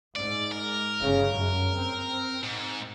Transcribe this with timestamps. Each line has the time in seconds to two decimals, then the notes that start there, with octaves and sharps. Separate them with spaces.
0.16 G#2 D5
0.52 A#4
1.00 G1 C#3
1.33 F#2
1.75 C4
2.44 G#2